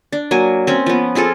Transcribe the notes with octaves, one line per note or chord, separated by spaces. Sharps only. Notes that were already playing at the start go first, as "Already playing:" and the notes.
D4
F#3 A#3 G#5
C4 C#4
F3 B3
C4 F4 G#4 A4